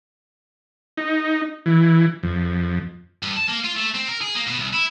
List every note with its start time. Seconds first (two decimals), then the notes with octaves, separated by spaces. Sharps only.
0.97 D#4
1.66 E3
2.23 F2
3.23 G2
3.37 A5
3.48 A#3
3.64 F4
3.76 A3
3.94 C4
4.08 A#4
4.21 G#4
4.35 A#3
4.47 B2
4.58 C2
4.73 E4